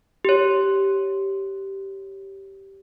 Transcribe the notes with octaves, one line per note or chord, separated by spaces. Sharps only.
G4 C#5